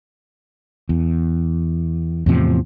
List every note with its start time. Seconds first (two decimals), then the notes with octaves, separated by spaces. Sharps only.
0.89 E2
2.26 E2 A2 C3 F3